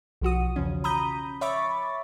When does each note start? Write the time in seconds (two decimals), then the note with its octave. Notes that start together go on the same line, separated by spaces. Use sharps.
0.21 B1 F3 F#4 D#6
0.56 E2 C#3 F3 C#4
0.84 A#5 B5 D#6 G6
1.41 C#5 E5 B5 C#6 D6 A6